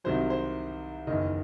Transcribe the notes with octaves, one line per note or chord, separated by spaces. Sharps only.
C2 C3 D#3 F#3 C5
C5
F#1 E2 D#3 D#5